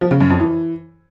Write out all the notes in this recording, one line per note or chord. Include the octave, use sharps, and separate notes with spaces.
F3
C#3
F#2
F2
E3